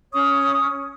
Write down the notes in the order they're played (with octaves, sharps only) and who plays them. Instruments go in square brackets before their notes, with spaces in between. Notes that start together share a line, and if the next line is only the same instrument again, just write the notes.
[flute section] C#4 C#5 C#6 D#6